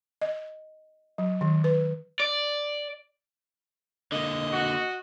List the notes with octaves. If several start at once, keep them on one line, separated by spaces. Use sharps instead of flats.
D#5
F#3
D#3
B4
D5
D3 A#3 D#5
F#4